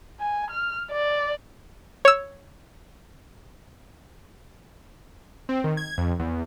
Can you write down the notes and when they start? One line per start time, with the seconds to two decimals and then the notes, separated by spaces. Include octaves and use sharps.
0.20 G#5
0.51 F6
0.92 D5
2.05 C#5 E6
5.49 C4
5.64 D#3
5.77 G#6
5.98 F2
6.19 E2